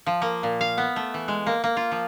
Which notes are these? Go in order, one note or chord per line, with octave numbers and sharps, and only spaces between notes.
F3
A#3
A#2
F5
B3
A3
E3
G#3
A#3
A#3
F4
F3